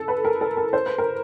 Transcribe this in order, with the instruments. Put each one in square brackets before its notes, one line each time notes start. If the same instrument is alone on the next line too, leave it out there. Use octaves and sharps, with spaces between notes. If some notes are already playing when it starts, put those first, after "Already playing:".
Already playing: [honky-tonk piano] A4
B4
A#4
A4
A#4
C5
B4
A#4